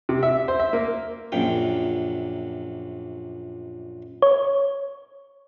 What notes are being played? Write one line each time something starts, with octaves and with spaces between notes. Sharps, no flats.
C3
E5
C5
E5
A#3
A#1 F#2 A#2 G5
C#5